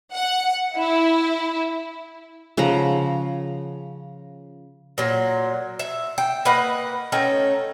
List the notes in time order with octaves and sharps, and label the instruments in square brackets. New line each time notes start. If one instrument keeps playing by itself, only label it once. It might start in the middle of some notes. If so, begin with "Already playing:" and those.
[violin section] F#5
E4
[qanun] C#3 F3 F#5 A#5
[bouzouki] A#2 F#3
E5
G5
A#3 B4 D#5 F#5
A3 C#4 D#4 G5